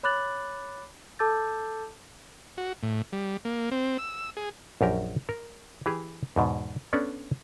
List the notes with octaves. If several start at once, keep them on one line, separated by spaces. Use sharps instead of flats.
C#5 B5 D6 F#6 A6 F#7
A4 A5 D6 E6 G6 A6
F#4
A2
G3
A#3
C4
E6
G#4
A#1 F#2 G4 A#4
A#4
E3 G4 G#4
E2 G#2 B2
B3 C#4 D4 A4 D5